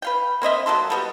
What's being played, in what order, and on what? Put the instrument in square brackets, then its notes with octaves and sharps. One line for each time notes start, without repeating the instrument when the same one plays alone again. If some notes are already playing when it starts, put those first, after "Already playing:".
[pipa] B4 F5 G5
A#3 C4 D#5 E5
F#3 A#3 A4 C6
G3 B3 D#5